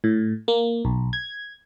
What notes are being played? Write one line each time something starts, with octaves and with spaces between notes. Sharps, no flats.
A2
A#3
B1
G#6